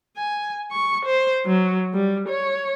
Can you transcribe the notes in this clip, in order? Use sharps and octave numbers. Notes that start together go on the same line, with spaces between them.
G#5
C#6
C5
F#3
G3
C#5